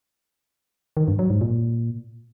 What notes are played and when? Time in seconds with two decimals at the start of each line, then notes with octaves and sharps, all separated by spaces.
0.97 D#3
1.08 G2
1.19 F#3
1.30 G#2
1.41 A#2